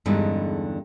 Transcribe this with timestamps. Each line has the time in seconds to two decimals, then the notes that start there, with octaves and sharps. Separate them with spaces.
0.06 E2 G2 D3 G#3 C#4 D#4